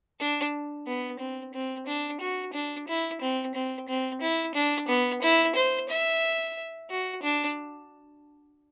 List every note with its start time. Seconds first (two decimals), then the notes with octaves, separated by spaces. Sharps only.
0.19 D4
0.86 B3
1.19 C4
1.53 C4
1.87 D4
2.20 F#4
2.53 D4
2.88 E4
3.21 C4
3.55 C4
3.88 C4
4.21 E4
4.54 D4
4.88 B3
5.22 E4
5.55 C5
5.89 E5
6.90 F#4
7.22 D4